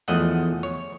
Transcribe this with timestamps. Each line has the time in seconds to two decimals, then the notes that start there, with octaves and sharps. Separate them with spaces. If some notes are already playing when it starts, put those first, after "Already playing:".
0.08 E2 F3 A3 D#5 F#5
0.63 C#5